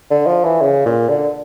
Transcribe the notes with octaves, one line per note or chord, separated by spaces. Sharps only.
D3
F3
E3
C#3
A#2
D3